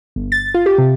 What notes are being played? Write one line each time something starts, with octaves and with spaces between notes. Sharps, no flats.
G1
A6
F4
G4
C3